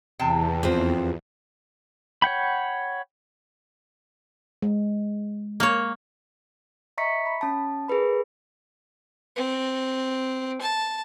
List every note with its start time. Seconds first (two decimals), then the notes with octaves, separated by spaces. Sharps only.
0.19 E2 C3 G5 A5
0.63 F2 C4
2.22 C#5 F#5 G5 B5
4.62 G#3
5.60 A#3 C#5
6.98 D#5 E5 A#5 C#6 B6 C#7
7.26 B5
7.41 C#4 A5
7.88 G#4 A#4 B4 B5
9.36 C4
10.61 A5